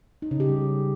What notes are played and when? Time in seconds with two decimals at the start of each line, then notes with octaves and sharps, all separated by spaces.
0.22 D#4
0.31 C#3
0.40 G4
0.49 G3